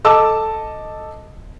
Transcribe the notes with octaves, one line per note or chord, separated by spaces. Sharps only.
A4 D#5 A5 D6 E6